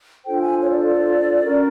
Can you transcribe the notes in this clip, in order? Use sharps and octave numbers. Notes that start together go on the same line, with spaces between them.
D4 F4 A4 C5 G5
G#5
C#5
D5
D5
C#4 F#4 A#4